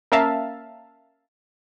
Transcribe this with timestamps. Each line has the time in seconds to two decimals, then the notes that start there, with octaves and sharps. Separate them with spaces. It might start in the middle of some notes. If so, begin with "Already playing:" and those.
0.12 A#3 C#4 A#4 E5 F5 A5